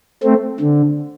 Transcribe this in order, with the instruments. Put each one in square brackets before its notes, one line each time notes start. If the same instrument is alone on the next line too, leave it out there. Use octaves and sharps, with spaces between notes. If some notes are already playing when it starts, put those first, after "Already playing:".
[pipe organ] A3 C4
D3